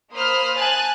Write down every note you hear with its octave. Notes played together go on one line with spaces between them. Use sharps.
A#3 C5 B5 D#6 F6
G#5 A5 F#6 A6